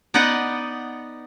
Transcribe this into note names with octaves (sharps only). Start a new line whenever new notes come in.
B3 D#4 B4 D5 D#5 F#5